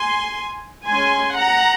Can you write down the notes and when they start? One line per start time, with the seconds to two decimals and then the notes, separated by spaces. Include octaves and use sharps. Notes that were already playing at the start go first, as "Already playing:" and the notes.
Already playing: G#5 C6
0.87 G#3 C#4 G#5 C6
1.37 F#5 A#5